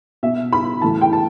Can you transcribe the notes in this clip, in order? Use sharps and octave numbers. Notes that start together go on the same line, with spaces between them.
B2 E5
B5
A2 E3 A5
G5
A5